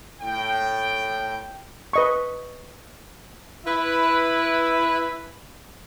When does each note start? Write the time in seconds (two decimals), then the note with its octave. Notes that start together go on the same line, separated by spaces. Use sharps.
0.21 A2 G5
1.93 B4 D#5 C#6
3.65 E4 B4 E5